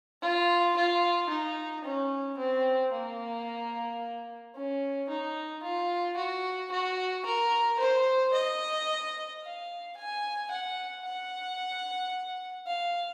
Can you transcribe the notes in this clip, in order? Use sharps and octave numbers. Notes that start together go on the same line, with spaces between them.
F4
F4
D#4
C#4
C4
A#3
C#4
D#4
F4
F#4
F#4
A#4
C5
D#5
F5
G#5
F#5
F#5
F5